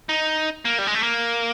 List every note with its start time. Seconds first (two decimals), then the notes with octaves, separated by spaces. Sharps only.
0.09 D#4
0.65 A#3
0.78 G3
0.87 G#3
0.95 A3
1.03 A#3